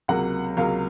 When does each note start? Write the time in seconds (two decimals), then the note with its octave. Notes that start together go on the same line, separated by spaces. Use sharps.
0.08 C#2 C3 F#3 A#3 F#5
0.57 C#2 C3 F#3 A#3 F5